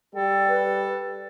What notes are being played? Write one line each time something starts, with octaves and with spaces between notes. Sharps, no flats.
G3 A4 G5
B4